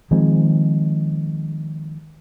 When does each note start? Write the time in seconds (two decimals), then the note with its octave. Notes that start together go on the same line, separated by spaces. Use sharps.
0.11 D#3 F3 G#3 C4